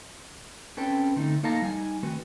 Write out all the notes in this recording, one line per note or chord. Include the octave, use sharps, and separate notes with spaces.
C4 C#4 A4 B4 G5 A5
D3 A3 C4 D#4
A#3 D#4 A4 F5 A5 A#5
G3 D#4 G#5
D#3 A3 C4 F#4 B4